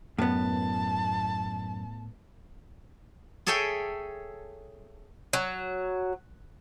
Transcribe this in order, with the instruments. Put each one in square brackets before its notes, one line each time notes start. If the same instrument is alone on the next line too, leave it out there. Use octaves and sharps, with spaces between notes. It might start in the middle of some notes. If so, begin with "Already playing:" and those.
[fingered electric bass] F#2 [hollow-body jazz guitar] A2 B3 [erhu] A5
[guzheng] G#4 A4 C#5 E5 G5 G#5
[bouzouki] F#3